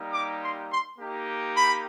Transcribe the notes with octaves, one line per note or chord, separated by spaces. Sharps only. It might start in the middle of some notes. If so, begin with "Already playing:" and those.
Already playing: G3 A#3 D#4 G4
D6
C6
C6
A#3 D#4 G4
B5